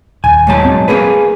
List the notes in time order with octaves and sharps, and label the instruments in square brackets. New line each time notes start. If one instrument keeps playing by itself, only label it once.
[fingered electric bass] D#1 [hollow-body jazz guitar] G#5
[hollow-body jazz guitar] G#2 F#3 A5
[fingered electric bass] C4
[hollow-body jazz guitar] A#3 G#4 B4